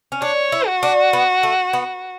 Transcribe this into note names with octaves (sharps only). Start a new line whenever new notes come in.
C#4
D4 C#5
E4
F#4
D4
B3
A3
B3